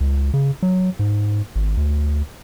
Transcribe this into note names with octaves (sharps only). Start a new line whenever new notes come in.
C#2
C#3
F#3
G#2
G#1
D2